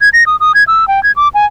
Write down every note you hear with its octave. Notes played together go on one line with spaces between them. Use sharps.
G#6
A#6
D#6
D#6
G#6
E6
G5
G#6
D6
G#5